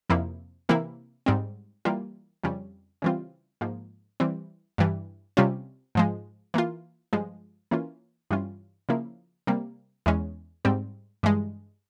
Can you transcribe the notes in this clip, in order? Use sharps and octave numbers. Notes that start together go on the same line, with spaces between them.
F2 C3 F3 A#3 E4
C3 E3 A#3 E4
G#2 G3 C4
E3 G3 A#3 F4
F2 C#3 G3 C#4
C#3 E3 G3 C4 F4
G#2 F3 A#3
E3 G3 C4
G2 E3 G3
C3 G3 C#4 F4
G#2 F3 G#3
E3 A#3 F4
G2 F3 G#3
E3 A#3 C#4 F4
G2 E3 G3 C#4 F4
C#3 F3 A#3 E4
C3 G3 A#3
E2 E3 G#3 C#4
G#2 G3 C4
G2 E3 G#3